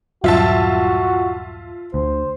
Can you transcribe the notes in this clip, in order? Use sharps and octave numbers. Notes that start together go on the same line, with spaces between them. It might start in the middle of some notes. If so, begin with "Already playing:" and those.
D#1 G2 F#3 F4 F#4 E5 A5
D2 C5